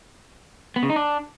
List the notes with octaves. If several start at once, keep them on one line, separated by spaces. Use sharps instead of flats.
B3
C#3
D#4
D4